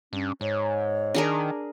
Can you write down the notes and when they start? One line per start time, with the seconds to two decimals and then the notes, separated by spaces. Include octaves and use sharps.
0.13 G2 C#4
0.41 G#2 C#5
1.15 D#3 D4 G#4 A#4